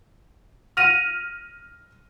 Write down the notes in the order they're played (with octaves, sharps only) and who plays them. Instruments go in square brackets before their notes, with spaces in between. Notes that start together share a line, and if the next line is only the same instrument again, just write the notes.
[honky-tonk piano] F6 A#6 D#7 F7